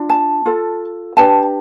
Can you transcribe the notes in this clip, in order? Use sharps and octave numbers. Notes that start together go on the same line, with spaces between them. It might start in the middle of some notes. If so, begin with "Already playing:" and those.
Already playing: D4 F4
A5
F4 A4
D4 G4 B4 A5